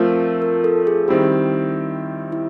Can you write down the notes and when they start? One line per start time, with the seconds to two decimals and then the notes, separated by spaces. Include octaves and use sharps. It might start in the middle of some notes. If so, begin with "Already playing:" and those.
Already playing: F3 A3 C4 F4 A#4
0.42 A#4
0.64 A4
0.87 G#4
1.08 D#3 G3 C4 E4 G4
2.32 E4